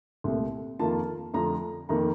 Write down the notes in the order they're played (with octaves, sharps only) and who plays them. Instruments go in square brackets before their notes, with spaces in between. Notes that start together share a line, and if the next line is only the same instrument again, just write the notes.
[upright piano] C2 A#2 A3 C4
F2 D#3 A#3 F4 A5
F2 D3 F3 A3 A#5
F2 D#3 A#3 A#5